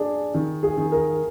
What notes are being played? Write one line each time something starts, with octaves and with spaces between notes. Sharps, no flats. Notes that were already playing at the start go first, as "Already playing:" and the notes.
Already playing: D4 G#4
D#3
G#4
D#3
A#4